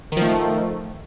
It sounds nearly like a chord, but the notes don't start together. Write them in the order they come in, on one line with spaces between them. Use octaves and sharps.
D#3 F3 A3